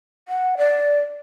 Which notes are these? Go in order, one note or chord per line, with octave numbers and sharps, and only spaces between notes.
F#5
D5